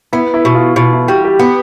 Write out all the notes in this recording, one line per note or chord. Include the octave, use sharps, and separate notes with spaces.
B3 E4
E4
B2
F4
B2 F4
E4
G3 F#4
G4
B3 G4